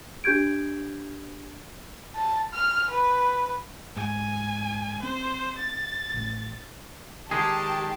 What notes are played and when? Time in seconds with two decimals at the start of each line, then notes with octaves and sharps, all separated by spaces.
0.24 D4 G4 G6 G#6 D7
2.16 A5
2.53 F6
2.90 B4
3.97 G#2 G#5
5.03 C4 C5
5.59 A6
6.14 A1
7.31 D#3 G#3 G4 G#4 A5